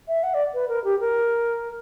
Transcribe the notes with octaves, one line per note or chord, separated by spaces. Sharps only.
E5
F#5
D5
B4
A#4
G4
A#4